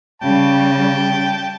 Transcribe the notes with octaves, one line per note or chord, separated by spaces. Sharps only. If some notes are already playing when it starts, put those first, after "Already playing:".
C#3 G3 G5 A5